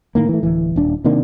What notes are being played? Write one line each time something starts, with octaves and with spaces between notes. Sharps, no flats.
A2 D#3 A#3
E3 A3
D1 E3
D#1 D4
C3 D#3 A#3 D4